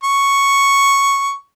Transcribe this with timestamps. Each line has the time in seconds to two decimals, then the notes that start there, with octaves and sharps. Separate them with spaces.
0.04 C#6